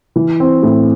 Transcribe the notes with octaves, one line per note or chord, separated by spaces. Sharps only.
E3
C4
A2